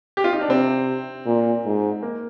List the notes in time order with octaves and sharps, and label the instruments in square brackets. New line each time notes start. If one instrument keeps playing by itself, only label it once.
[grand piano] G4
F4
D#4
D4
[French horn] C3 [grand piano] C4
[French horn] A#2
G#2
[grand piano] A#3